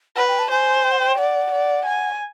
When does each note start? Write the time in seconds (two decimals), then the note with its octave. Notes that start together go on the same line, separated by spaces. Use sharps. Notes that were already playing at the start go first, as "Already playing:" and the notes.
0.16 B4 F#5
0.28 G5
0.39 A5
0.51 C5 G#5
0.84 G5
0.92 F#5
0.99 G5
1.17 D5 F#5
1.52 D5
1.85 G#5